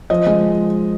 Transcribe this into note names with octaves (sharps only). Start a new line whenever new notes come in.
F3 D#5
G#3